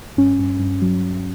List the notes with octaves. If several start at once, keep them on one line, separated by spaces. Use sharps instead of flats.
G2 C#4
G2
G2
F#3